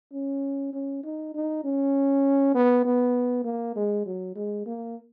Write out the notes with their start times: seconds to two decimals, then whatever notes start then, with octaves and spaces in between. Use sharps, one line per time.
0.13 C#4
0.73 C#4
1.04 D#4
1.34 D#4
1.64 C#4
2.54 B3
2.85 B3
3.44 A#3
3.76 G#3
4.06 F#3
4.36 G#3
4.66 A#3